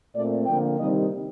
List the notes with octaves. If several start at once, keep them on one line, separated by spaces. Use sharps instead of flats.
A#2 A3 C4 D5
D3 F3 A#3 D4 G5
C3 D#3 G3 C4 D#4 D#5